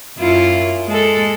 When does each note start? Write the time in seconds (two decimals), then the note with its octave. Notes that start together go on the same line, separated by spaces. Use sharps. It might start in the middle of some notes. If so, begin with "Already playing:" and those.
0.19 F#2 E4 F4
0.87 G#3 A4